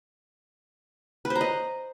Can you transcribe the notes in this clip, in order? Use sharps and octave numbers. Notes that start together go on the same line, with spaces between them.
B4
C5
A#5
D#5